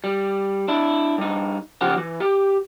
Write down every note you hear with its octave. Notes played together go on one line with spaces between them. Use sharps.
G3
D4 E4
G2 D#4
C#3 F3 G4 F#5
E3
G4